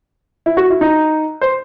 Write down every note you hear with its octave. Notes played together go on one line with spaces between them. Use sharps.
E4
F#4
E4
D#4
C5